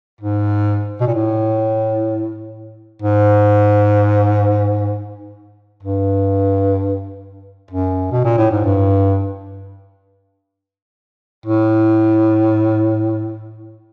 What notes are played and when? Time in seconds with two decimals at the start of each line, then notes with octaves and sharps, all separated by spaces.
0.21 G#2
1.01 B2
1.07 A#2
1.15 A2
3.02 G#2
5.83 G2
7.71 F#2
8.12 B2
8.24 A#2
8.38 A2
8.51 G#2
8.65 G2
11.46 A2